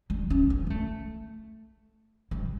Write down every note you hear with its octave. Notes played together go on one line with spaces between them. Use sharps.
G3
C#4
B3
B3
A3
G3